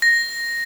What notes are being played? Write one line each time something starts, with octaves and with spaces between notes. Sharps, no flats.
A#6